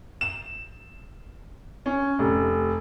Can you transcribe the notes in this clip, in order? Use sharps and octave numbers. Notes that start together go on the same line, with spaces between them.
E7
C#4
F1